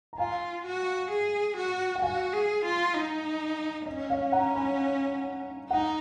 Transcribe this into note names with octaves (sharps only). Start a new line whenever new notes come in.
A#5
F4 F5 G#5
F#4
G#4
F#4
F#5
F#4 F5 G#5
G#4
F4
D#4
C#4 D#5
C#5 F5
F#5 A#5
G#5 B5
D#4 F#5 A#5